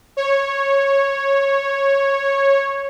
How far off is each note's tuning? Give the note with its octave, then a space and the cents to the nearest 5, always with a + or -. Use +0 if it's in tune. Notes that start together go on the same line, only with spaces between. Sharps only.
C#5 -10